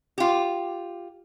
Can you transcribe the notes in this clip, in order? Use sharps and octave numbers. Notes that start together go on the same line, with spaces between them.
F4 G4